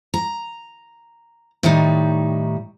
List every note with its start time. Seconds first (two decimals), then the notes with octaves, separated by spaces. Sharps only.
0.14 A#5
1.63 A2 D#3 G3 D#4